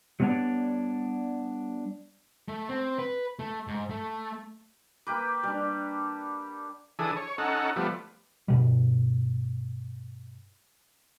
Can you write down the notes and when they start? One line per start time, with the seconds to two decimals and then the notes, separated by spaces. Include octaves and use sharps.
0.20 F#3 G3 B3 D4 C#5 D5
2.48 A3
2.69 C4
2.99 B4
3.39 A3
3.67 G#2
3.90 A3
5.07 A#3 G4 B4 D6
5.43 G3 D4
6.99 E3 D4 G#4 A4 D#6
7.17 C#5
7.38 C#4 D#4 A4 F#5
7.76 F3 G3 A3 B3
8.48 G2 B2 G3